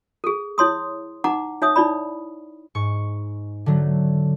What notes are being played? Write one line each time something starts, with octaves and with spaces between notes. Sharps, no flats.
G#4 A4
E4 C#5 C6 D#6
D#4 F#5 A#5 D6
D#4 C#5 E5 D#6
D#4 E4 D5 B5
G#2 C#6
D3 F#3 A3